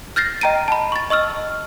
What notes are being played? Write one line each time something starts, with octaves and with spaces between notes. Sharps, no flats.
F6 G6 A6 A#6 C7
D#5 G5 A#5 D7 D#7
A5 B5
C#6 A6
D#5 C#6 E6 F6